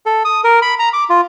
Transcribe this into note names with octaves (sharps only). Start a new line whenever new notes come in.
A4
D#6
A#4
B5
A#5
D6
F4